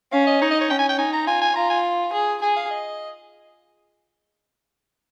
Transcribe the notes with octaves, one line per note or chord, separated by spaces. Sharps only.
C#4 F5
D#5
D#4 C#5
D#5
C#5
C#4 G5
G#5
G5
D#4 G#5
A#5
F4 G#5
G#5
F4 A#5
G#5
G#4
G#4 G#5
F5
D#5